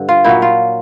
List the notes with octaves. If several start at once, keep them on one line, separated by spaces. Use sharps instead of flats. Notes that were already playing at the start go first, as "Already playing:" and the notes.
Already playing: G2 D3
F4
A#2 F#3 E4
F4